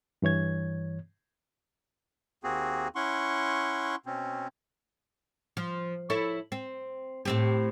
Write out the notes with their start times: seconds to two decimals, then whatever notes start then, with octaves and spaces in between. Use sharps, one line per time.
0.22 G2 E3 C#5 G#6
2.44 D#2 A#3 C4 F#4 G#4
2.95 C#4 E4 F#5 C6 C#6
4.06 B2 C4 C#4
5.57 F3
6.10 E4 A4 C#5
6.52 C4
7.25 A2 C4 G4